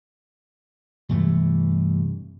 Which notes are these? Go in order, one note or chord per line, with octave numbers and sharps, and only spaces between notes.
G2 C3 E3 A3